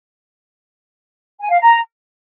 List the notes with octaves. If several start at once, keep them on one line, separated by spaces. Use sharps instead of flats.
G#5
F5
A#5